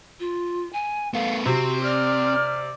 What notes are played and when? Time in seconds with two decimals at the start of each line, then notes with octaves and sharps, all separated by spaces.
0.20 F4
0.73 G#5
1.14 A3 B3 F5
1.46 C3 C4 F#4
1.83 D5 F6